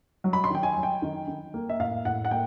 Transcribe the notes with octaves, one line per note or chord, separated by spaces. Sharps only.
F#3
B5
C6
D#3 G5
G#5
F#3
G5
D#3
D#3
A#3
E5
A2 F5
A2 F#5
F#5
A#3 G5